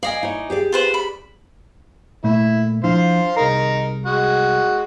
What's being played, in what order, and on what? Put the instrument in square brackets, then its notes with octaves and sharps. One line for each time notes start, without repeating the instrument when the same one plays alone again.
[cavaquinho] D5 D#5 G#5 [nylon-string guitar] F5
[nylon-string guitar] D#4 E4 C#5
G4 G#4 D5
[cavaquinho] F4 B4 C5
B5
[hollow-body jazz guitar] A#2 A3 [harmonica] E4
[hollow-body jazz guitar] F3 D4 E4 [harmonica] C5 F5
[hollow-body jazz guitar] C2 G#4 A#5 [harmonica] D#4 A#4
[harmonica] G#3 F#4